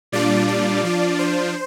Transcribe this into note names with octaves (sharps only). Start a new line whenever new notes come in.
A#2 G3 D4 F4 D5
D5
F3 D4 F4
C5